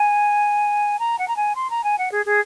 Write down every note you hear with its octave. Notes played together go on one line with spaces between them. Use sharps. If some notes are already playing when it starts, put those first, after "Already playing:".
Already playing: G#5
A#5
F#5
A#5
G#5
C6
A#5
G#5
F#5
G#4
G#4